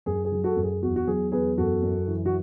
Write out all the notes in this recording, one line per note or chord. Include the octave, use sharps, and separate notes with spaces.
F#2 G#4
G#4
F#3
F#4 A4
F#2
G#4
E2 F#4
F#4
F#3 G#4
E2 G#4 B4
F#2 F#4 A4
F#2
E3
F#4